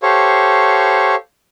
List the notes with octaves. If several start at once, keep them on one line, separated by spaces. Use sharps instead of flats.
G4 A4 C5 C#5 F5 C#6